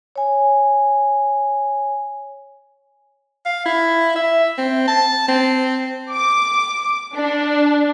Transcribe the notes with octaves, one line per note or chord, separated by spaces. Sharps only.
C#5 G#5
F5
E4
E5
C4
A5
C4
D6
D4